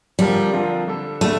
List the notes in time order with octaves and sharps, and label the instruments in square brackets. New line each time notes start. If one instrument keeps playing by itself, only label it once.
[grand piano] D3 F3 C4 F4 A#4 [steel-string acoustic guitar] G3
[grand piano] D3 F3 C4 F4 A#4
D3 G3 D4 A4
[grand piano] D3 G3 D4 [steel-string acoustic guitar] A3